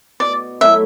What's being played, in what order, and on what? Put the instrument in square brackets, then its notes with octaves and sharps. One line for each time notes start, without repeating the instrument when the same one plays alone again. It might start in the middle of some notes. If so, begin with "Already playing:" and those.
[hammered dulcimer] B2 [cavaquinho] D5
[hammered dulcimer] F#3 A3 E4 [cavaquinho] E5